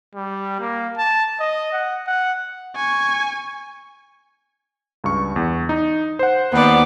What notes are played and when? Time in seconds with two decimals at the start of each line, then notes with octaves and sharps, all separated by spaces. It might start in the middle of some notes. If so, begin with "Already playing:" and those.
0.15 G3
0.60 A#3
0.97 A5
1.40 D#5
1.73 F#5
2.07 F#5
2.76 G#5 C#6
5.04 C#2 G2 C#6
5.36 E2
5.69 D#4
6.19 C5 F#5
6.53 D#2 B3 D5